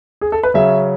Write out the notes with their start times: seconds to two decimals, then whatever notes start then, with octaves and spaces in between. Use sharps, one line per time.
0.21 G#4
0.32 A4
0.43 B4
0.54 C#3 F#3 C#4 E5